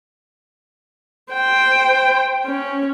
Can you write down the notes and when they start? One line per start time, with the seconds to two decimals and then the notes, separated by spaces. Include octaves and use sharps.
1.33 C5 G5
2.46 C#4